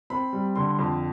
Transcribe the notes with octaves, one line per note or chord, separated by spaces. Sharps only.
C4 B5
G3
D3 C6
F2